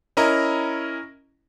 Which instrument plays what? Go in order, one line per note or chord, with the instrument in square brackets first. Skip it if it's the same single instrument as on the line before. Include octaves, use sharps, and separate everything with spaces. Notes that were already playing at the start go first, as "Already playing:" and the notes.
[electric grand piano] C#4 E4 A#4 D#5 A#5